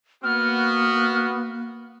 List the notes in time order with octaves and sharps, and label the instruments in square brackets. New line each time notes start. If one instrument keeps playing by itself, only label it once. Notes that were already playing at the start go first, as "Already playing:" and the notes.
[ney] A#3 [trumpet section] B3 F#4 [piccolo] F6